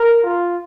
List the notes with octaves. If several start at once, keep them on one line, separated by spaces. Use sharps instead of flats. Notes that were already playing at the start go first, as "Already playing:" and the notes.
Already playing: A#4
F4